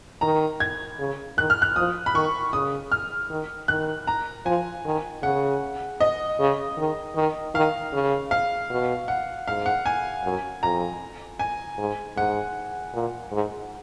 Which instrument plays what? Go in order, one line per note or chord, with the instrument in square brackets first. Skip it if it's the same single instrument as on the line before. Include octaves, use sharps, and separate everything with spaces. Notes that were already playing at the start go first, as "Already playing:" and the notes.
[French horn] D#3 [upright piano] A#5
[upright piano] G#6
[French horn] C#3
[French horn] D#3 [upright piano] F#6
[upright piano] F6
F#6
[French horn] F3 [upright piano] D#6
[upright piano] B5
[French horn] D#3 [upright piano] C#6
[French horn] C#3 [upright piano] D#6
[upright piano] F6
[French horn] D#3
[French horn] D#3 [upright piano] F#6
[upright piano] A#5
[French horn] F3 [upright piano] G#5
[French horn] D#3
[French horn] C#3 [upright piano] F#5
[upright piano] D#5
[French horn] C#3
D#3
D#3
[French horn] D#3 [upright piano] F5
[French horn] C#3
[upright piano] F5
[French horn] B2
[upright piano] F#5
[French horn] G#2 [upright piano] F5
[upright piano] F#5
G#5
[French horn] F#2
[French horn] F2 [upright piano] A#5
[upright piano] G#5
[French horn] G#2
[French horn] G#2 [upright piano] F#5
[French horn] A#2
G#2